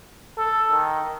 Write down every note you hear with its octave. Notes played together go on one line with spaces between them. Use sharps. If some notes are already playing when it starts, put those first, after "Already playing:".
A4
D#3